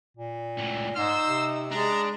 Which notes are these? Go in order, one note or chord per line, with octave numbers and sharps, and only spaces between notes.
A#2
C#2 A2
G#2 D#4 C5 E6
C3
G#3 D4 A#5